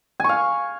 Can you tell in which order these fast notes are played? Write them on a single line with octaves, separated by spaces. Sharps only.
G#5 C#6 F5